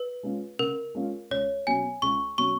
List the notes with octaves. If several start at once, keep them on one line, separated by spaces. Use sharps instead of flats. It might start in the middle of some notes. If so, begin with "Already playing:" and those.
Already playing: B4
G#3 C#4 F4
C#3 A#4
G#3 C#4 F4
C#2 C#5
B2 F#3 C#4 G#5
C#2 C#6
B2 F#3 C#4 C#6